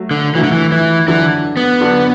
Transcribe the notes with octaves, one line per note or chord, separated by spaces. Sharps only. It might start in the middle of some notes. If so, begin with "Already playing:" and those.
Already playing: F#3 A3 F#4
D3
E3 F#3 A3 F#4
D3
E3
E3
D3 E3 F#3 D4
B3
D3 F#3 D4